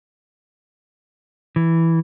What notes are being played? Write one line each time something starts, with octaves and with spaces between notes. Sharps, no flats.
E3